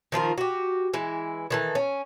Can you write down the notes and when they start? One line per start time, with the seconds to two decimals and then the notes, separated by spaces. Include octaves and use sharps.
0.12 D#3 F3 F4 A#4
0.38 F#4 G4
0.94 E3 G#3 E4
1.50 D#3 E3 A4
1.75 C#4